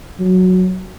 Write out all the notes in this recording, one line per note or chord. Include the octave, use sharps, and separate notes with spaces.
F#3